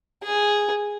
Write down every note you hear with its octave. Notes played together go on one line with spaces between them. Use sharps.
G#4